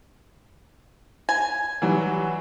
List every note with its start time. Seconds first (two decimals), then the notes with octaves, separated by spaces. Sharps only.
1.29 G#5
1.82 E3 F#3 G3